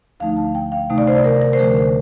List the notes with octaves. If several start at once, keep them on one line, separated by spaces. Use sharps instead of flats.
D2 D3 F3 A3 D#4 F5
A5
G5
F5
C3 D#3 A3 D#4
D5
C5
D5
A#4
A#4
C5
D2 D3 F3 A3 A#4
C5